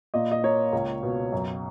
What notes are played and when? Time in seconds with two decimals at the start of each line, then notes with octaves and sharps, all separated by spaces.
0.14 A#2 D#5
0.32 D#5
0.43 A#3 C#5
0.73 C#2
1.03 B2
1.33 F#2